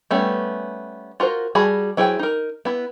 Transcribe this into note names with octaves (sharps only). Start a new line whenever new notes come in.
G3 A3 B3 C#4
F4 F#4 A#4 C5
G3 F#4 G#4 A5 B5
F#3 E4 G#4 C5 G5
D#4 A#4
B3 E4